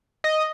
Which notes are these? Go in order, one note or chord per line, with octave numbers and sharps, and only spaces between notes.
D#5